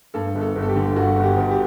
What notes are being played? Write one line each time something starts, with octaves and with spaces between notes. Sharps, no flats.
G2 A4
G1
A4
G1
A4
G4
D3
G2 F#4
G1
G4
G1
G4